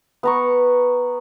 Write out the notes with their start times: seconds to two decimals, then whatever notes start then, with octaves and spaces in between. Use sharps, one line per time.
0.23 B3 A#5 C#6